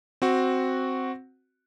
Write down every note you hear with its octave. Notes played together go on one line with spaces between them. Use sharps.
C4 F#4